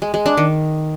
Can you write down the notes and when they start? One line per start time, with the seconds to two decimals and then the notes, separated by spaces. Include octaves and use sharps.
0.02 G#3
0.14 G#3
0.26 D4
0.37 D#3